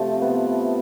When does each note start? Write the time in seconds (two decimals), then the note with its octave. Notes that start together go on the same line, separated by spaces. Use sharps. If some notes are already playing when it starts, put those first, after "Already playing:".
Already playing: C3 F3 A3
0.22 B3